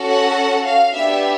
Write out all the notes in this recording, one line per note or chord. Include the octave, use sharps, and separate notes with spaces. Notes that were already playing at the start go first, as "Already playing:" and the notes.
Already playing: C#4 F#4 A4
F#5
F5
B3 D4 G4 E5